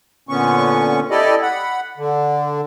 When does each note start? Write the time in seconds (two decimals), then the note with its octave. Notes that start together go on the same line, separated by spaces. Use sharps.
0.29 A#2 D3 B3 C#4 C#6
1.10 E4 G4 A4 D5 D#5
1.42 F#5 B5
1.98 D3